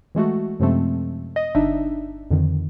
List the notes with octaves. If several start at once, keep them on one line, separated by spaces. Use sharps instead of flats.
E3 G#3 A3 F#4
F#2 C3 F3 G#3 A3 C4
D#5
G1 D4 D#4 E5
F2 D3 D#3